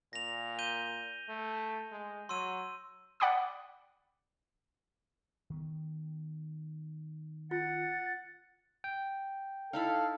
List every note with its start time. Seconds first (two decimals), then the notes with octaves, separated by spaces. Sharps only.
0.13 A#2 A#6 F7
0.59 G6 D#7 G7
1.29 A3
1.92 G#3
2.29 F#3 C6 E6 D#7
3.20 D5 F#5 G5 B5 D6 D#6
5.50 D#3 B3
7.51 F4 F#5 A6
8.84 G5
9.73 D#4 E4 A4 F5 B5